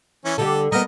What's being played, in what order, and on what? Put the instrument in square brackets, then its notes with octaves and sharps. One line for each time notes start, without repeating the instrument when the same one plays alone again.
[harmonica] E3 C#4
[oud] D3 G3 G4 [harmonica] A4
[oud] G3 B3 [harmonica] A#4 D#5